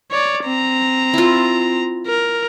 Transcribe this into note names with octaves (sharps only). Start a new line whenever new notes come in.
C#5 D5
C4 A#5
E4 F4
A#4